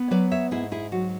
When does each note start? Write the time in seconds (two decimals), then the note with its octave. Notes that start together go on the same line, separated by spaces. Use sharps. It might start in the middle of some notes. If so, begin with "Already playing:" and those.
Already playing: B3
0.11 F#3 B4 D5
0.31 C#5 E5
0.51 G#2 E4 G#4
0.72 E4 G#4
0.92 F#3 F#4